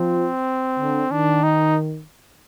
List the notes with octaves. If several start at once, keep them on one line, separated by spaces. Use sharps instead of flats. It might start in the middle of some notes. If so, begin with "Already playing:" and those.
Already playing: F3 C4
D3
D#3 D4
D#4